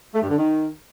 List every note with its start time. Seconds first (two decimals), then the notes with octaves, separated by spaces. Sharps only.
0.14 A3
0.22 G2
0.30 D3
0.37 D#3